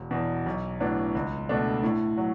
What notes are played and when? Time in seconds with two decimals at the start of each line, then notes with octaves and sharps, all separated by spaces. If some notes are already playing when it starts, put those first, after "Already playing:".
Already playing: E1
0.11 E2 B2
0.46 B1
0.80 A2 F#3 B3 D4
1.15 C#2
1.49 B2 A3 D4
1.83 A2
2.17 F#3